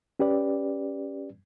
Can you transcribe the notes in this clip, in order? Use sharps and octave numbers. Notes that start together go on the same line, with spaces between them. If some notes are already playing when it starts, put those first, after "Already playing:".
C#4 G4 B4 D5